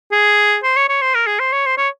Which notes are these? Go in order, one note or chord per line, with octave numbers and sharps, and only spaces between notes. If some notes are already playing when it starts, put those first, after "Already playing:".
G#4
C5
C#5
C#5
C5
A#4
G#4
C5
C#5
C5
C#5